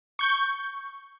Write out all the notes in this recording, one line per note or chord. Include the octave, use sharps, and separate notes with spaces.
C#6 G6